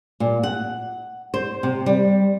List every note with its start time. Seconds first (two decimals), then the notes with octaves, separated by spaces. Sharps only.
0.20 A#2
0.43 F#5
1.34 C5
1.63 C3
1.86 G3